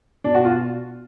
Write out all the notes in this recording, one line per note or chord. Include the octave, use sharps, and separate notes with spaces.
B2 D4
F#4
F4